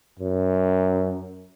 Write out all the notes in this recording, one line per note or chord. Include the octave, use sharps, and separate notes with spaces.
F#2